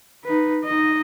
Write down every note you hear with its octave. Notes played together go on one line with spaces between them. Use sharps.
D#4 B4
D#4 D#5